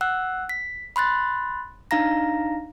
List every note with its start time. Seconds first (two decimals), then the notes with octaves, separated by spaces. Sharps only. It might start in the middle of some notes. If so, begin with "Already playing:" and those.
0.01 F#5 E6 F#6
0.49 B6
0.96 B5 C6 F#6 A6
1.91 D4 D#4 F5 A#5 A#6